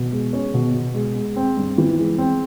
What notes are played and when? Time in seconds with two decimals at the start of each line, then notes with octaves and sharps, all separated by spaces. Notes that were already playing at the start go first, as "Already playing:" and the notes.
Already playing: B2
0.12 G#3
0.33 C#4
0.54 B2
0.74 B2
0.94 G#3
1.16 G#3
1.36 C4
1.57 G2
1.78 E3
1.98 G#3
2.18 C4